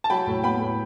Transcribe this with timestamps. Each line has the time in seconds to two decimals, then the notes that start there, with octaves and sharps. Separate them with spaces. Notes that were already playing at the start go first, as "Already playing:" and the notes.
0.04 A5
0.10 F#3 G5 B5
0.27 A2
0.43 B3 G5 B5
0.60 A2